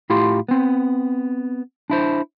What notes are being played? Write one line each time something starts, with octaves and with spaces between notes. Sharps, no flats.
A2 E4 F4 G4 C6
B3 C4
D4 E4 C5